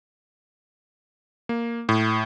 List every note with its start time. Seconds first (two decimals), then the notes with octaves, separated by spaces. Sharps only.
1.49 A#3
1.89 A2